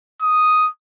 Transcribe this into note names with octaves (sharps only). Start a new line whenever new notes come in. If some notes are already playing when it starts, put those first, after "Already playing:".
D#6